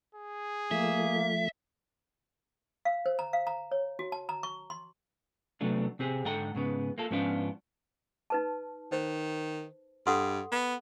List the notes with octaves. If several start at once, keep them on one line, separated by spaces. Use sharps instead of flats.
G#4
F3 A3 A#3 E5
F5
C5
A#5
F5
A#5
C#5
F#4
A5
A#5
C#6
C6
C3 F#3 A3 B3 D4
C3 C4 G4 G#4
G#2 D3 A4 F#5 G5 A#5
G#2 C#3 B3
A#3 F4 A4
G#2 F3 B3 C#4 D4 F4
D#4 B4 A5
D#3 C5
G2 A4 F#5 C6
B3